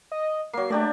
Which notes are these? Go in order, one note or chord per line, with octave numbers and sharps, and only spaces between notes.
D#5
F#3 A#3 C7
A3 D4 G4 D5